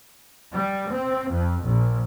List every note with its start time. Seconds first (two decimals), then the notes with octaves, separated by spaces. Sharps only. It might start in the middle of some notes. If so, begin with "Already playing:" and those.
0.53 G3
0.90 C4
1.30 F2
1.64 A#1